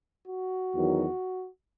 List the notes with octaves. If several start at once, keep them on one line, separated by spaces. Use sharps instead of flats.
F#4
E2 D#3 F#3